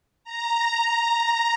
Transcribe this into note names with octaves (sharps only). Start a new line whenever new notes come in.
A#5